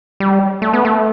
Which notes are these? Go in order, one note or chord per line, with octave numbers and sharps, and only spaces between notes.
G3
A3
B3
A3